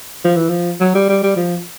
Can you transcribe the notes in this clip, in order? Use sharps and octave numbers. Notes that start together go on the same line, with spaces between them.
F3
E3
F3
F#3
G3
G3
G3
F3